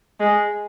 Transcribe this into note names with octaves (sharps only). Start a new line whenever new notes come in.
G#3